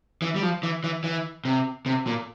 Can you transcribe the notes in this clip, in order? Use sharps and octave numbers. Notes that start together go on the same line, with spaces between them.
E3
G3
F3
E3
E3
E3
C3
C3
A#2